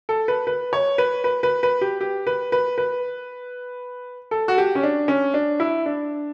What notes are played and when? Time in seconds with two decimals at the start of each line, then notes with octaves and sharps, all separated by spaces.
0.09 A4
0.28 B4
0.47 B4
0.73 C#5
0.98 B4
1.24 B4
1.43 B4
1.63 B4
1.81 G4
2.01 G4
2.27 B4
2.52 B4
2.78 B4
4.31 A4
4.48 F#4
4.58 G4
4.75 C#4
4.83 D4
5.08 C#4
5.34 D4
5.60 E4
5.86 D4